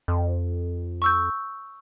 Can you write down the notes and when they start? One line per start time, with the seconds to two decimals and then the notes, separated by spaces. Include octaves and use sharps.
0.08 F2
1.02 C#6 E6 G6